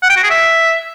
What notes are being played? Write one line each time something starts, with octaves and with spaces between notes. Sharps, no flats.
F#5
G5
F#4
G#4
E5